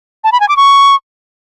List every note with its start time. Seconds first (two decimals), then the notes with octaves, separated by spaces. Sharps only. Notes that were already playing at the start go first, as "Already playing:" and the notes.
0.24 A5
0.32 B5
0.40 G#5
0.49 D6
0.57 C#6